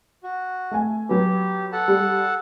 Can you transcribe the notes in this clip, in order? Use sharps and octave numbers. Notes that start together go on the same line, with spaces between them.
F#4
A3 G#5
F#3 B3 G4
A4 F#5 A5
G3